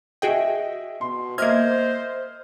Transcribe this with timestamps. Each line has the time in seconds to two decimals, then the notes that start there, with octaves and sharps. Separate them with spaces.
0.22 F#4 G#4 D#5 E5 G5
1.01 B2 C6
1.38 A#3 C5 D#5 E5 F6 G#6